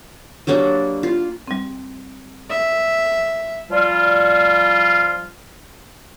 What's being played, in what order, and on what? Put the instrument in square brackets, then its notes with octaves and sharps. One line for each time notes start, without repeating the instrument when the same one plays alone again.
[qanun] F#3 G3 A#3 D4
F4
[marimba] G3 C4
[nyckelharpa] E5
[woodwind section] F3 G3 F4